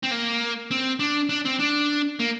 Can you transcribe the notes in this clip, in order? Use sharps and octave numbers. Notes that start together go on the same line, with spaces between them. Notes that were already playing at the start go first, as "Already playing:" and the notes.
C4
A#3
C4
D4
D4
C4
D4
A#3